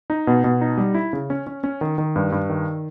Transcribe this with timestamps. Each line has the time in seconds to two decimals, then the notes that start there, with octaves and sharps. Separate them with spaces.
0.10 D#4
0.27 B2
0.44 B2
0.61 D#4
0.78 G3
0.95 E4
1.13 C#3
1.30 C#4
1.47 C#4
1.64 C#4
1.81 D#3
1.98 D#3
2.16 G2
2.32 G2
2.49 D#3